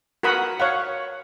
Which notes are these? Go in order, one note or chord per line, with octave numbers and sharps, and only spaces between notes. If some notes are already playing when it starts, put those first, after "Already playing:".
F#4 A#4 F#5 B5 D#6
C#5 F5 F#5